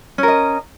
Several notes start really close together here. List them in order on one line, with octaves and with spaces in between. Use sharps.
C#4 A#4 D#5